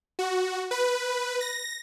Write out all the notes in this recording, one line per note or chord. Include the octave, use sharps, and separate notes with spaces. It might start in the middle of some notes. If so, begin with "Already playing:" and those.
F#4
B4
A#6